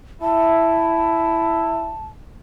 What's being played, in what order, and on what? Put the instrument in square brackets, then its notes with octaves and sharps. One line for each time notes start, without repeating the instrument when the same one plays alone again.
[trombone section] E4 [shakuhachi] A5